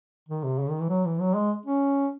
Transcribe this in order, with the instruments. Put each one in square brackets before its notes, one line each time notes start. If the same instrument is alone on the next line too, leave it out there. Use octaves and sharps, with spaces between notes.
[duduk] D#3
C3
C#3
D#3
E3
F#3
E3
F#3
G#3
C#4